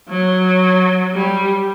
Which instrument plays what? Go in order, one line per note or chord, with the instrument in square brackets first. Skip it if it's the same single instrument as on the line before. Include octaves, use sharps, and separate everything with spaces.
[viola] F#3
G3